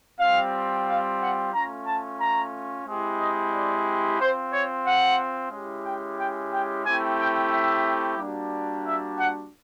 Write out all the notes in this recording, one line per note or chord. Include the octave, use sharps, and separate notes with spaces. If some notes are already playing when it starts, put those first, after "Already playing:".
G3 C4 F4 F5
F5
F#5
A3 C#4 F4 A#5
A5
A#5
G#3 C4 E4 G4
D#5
D5
C4 F4 C5
C#5
F#5
G#3 C#4 E4 G4
G5
G5
G5
A3 C4 E4 G4 G#5
G5
E5
G3 A#3 D4 F#4
E5
F#5